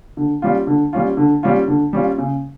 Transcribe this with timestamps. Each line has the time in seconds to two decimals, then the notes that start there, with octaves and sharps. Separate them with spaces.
0.17 D3
0.42 G3 C#4 F4
0.67 D3
0.93 G3 C#4 F4
1.17 D3
1.43 G3 C#4 F4
1.68 D3
1.93 G3 C#4 F4
2.18 C#3